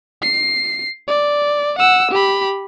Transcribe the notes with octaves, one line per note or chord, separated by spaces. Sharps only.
C7
D5
F#5 E6
G4 B5